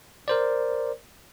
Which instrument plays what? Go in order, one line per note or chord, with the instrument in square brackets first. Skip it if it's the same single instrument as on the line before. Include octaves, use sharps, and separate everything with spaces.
[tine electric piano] A#4 C5 D5